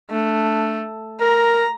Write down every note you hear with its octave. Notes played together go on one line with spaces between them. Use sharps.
A3 D4
A#4 A#5